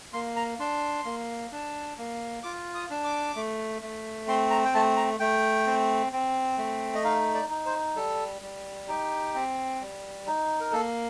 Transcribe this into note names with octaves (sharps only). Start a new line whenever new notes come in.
A#3 C6
A#5
D4 C6
A#3
D4
A#3
F4 D6
D#6
D4
D6
A3
A3
C4 C6
A#5
G5
A3 A5
A#5
A3 G5
C4
C4
A3
D#5
D#4 F5
D5
D#4
C5
G3 A4
G3
D#4 G4
C4
G3
D#4
A#4
A#3 A4